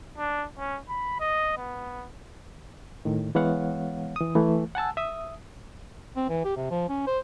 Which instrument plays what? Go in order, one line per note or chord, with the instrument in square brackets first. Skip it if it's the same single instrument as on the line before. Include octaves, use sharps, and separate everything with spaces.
[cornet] D4
C#4
B5
D#5
B3
[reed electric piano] A2 D#3
E3 G#3 B3 C#5 F5 F#5
E3 D#6
E3 A3
F#5 G#5 A5 E6
E5 D#6
[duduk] C4
E3
G4
C3
F3
C#4
C5